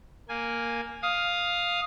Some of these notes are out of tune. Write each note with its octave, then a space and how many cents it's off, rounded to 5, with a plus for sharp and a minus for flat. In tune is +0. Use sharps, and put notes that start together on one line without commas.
A#3 +0 G#5 +0
F5 +5 D#6 +0